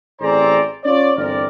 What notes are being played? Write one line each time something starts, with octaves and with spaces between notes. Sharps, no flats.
A1 C4 G#4 C5 D5 A#5
C#4 F4 C#5 D5
G1 E2 C4 A#4 D5